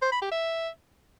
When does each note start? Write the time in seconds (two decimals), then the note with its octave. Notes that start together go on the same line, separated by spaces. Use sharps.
0.02 C5
0.12 B5
0.22 G4
0.31 E5